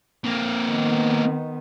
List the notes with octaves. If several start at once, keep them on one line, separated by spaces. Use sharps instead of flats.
A#3 C4
D#3 B3